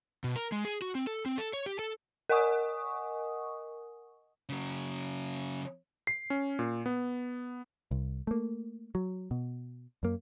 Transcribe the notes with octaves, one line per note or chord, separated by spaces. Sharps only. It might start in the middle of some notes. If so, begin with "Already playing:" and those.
B2
A#4
G#3
G#4
F#4
C4
A4
C4
A4
C#5
G4
A4
A#4 D#5 F#5 G#5 C#6 D#6
C#3 F#3
C7
C#4
A#2
B3
C2
A3 A#3
F#3
B2
F#2 A#3